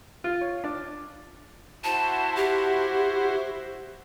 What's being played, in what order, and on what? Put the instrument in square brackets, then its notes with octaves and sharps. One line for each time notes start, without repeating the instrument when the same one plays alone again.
[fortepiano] F4
C#5
D4
[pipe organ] E4 F#4 C5 [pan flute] A5
[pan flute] G4